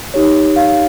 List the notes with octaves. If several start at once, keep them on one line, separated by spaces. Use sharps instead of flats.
D#4 G4 C#5
F5